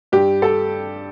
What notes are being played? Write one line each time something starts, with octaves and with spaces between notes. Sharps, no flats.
G2 G4
A4